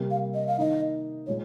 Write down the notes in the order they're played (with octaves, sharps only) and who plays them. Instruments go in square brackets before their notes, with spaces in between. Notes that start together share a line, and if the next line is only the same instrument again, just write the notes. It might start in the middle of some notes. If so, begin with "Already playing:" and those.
Already playing: [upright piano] C3 G3 A#3
[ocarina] F5
D#5
F5
[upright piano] D#3 A#3 D#4 [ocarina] D#5
[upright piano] A#2 G#3 [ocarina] C#5